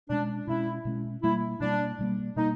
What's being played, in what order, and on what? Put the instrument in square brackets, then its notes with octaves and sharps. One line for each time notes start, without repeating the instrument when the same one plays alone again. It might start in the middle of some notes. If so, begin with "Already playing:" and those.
[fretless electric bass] B2 G#3 C#4 [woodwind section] D4
[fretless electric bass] B2 G#3 C#4 [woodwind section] E4
[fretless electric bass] B2 G#3 C#4
[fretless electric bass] B2 G3 A#3 [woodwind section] E4
[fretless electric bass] B2 G3 A#3 [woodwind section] D4
[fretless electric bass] B2 G3 A#3
[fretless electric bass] B2 G3 A#3 [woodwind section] D#4